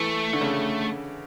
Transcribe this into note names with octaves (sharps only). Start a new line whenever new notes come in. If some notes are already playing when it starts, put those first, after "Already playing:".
Already playing: E3 A3
D3
C#3